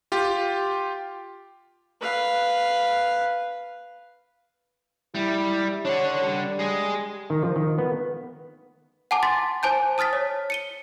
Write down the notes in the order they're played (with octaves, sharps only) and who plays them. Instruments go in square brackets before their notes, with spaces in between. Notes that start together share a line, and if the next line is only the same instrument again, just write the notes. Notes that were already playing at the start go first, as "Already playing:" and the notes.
[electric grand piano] F4 G4
[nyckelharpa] B4 F5
[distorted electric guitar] G3 [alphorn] E4
[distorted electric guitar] D4 F#5 [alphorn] C#5
[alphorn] G3
[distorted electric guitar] G#4 D#5
[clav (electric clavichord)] D#3
F3
D#3
B3
[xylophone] F#5 G#5 A5 D6
C6 A6 B6
C5 G#5 A5 G6
A5 D#6 F6 A6 B6
C#5
C#7 D#7 G7